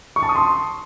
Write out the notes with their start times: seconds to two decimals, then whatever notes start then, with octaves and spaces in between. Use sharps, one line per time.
0.16 C#6
0.23 A5
0.29 D#6
0.36 C6